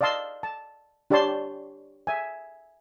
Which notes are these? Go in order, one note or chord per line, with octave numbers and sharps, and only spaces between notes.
D5 D#5 F5 A5 C6 E6
A5
D4 G4 C#5 D5 A5 C6
E5 G#5